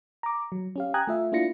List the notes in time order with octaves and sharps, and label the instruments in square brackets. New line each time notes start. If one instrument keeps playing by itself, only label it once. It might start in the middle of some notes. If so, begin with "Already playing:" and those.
[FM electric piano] A#5 D6
F#3
C#4 G4 F5
G5 G#5 A#5 D#6 F#6 G#6
A3 F4 E5
A#3 D4 E4 F4 A#6 C#7